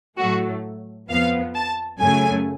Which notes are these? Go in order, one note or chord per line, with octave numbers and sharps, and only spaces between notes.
A2 F#3 A3 F#4
F2 F3 B3 F5
A5
F#2 C#3 F#3 A3 G#5